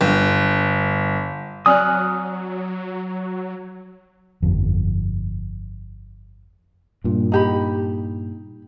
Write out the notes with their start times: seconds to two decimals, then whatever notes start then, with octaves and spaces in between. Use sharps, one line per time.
0.01 G1
1.66 F#3 C4 D5 G#5 D#6 F6 F#6
4.42 G1 F2
7.04 G2 A#2
7.32 D#4 G4 B5